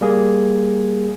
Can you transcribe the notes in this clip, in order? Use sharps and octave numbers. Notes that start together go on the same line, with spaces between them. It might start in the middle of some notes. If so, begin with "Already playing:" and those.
G3 A#3 G#4